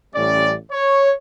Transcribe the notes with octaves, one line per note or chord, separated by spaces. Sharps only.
A1 A2 G3 C#4 D5
C#5